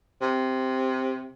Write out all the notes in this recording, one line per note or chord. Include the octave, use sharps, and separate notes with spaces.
C3